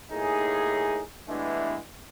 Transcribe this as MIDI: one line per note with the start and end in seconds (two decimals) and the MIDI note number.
0.12 1.01 39
0.12 1.01 45
0.12 1.01 63
0.12 1.01 68
1.28 1.77 43
1.28 1.77 52
1.28 1.77 56
1.28 1.77 57
1.28 1.77 59
1.28 1.77 62